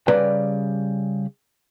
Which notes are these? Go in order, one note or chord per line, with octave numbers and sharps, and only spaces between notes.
C#3 G3 B4 D5 A#5 C6